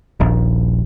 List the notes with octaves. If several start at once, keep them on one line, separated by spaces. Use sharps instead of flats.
D#1 A#1